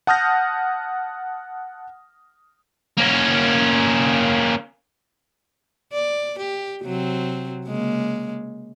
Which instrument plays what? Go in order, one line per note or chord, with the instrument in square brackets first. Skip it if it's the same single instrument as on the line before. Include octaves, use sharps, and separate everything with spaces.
[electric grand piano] F#5 A5 D#6 F6 G6 A#6
[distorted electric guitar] A#3 C#4
[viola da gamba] D5
G4
C3 F#3 C4
C#3 G#3 A#3